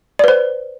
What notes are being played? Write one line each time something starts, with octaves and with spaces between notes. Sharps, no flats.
B4 C5 D5